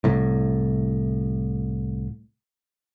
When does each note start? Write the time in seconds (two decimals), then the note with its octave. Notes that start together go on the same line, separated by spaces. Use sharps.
0.04 C2 A2